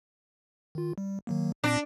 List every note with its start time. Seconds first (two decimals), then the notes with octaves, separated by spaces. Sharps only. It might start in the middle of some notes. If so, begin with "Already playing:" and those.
0.75 D#3 F4
0.98 G3
1.27 D#3 F#3 A#3
1.64 A#2 C4 D4 A#6